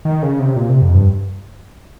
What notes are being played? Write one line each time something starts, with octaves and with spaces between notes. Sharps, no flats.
D#3
C#3
C3
A#2
C3
F2
G2